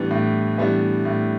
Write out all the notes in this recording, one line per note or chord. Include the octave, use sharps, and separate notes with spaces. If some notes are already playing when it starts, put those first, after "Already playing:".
Already playing: A2 E3 G3 B3 D4
A2
E3 G3 B3 D4
A2